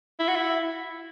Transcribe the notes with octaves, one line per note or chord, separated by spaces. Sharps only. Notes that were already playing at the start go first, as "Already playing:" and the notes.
E4
F#4
E4